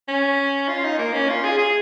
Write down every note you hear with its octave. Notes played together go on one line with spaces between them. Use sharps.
C#4
F4
D#4
A#3
C#4
F4
G#4
G#4